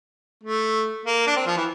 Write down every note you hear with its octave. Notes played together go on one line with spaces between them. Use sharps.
A3
A#3
D4
C4
F3
E3